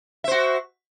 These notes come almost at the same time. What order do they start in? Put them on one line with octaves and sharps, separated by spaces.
E5 C5 F#4